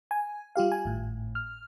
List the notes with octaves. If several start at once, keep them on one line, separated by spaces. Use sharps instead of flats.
G#5
G3 F4 G4 F5
G#5
G#1 A2
F6